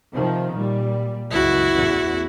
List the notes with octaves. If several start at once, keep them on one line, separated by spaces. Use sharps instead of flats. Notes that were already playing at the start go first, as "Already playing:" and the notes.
C3 D#3 F3
A#2 G3
C#2 F#2 E4 F#4
A1 E2